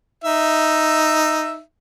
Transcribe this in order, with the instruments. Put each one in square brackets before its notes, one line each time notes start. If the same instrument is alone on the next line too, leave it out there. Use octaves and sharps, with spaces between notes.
[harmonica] D#4 E5